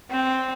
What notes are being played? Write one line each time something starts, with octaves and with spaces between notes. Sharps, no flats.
C4